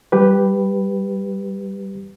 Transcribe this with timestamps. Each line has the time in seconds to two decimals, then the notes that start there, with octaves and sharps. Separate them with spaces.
0.12 G3 G4 B4